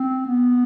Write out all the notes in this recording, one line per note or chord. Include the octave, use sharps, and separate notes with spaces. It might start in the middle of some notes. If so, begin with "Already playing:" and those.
Already playing: C4
B3